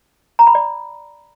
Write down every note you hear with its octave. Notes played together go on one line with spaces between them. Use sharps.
A#5
B5
D5